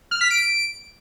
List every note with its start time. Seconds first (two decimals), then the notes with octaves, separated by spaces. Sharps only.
0.11 F6
0.21 B6
0.31 D7